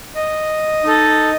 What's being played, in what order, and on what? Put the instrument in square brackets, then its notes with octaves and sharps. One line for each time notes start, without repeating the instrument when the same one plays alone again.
[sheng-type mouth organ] D#5
D#4 A4